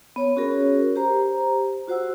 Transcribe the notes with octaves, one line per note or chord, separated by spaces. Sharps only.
B3 C#5
C#4 F#4 G#4 A#4 C#5
G4 C5 A#5
F4 F#4 C5 F#5 E6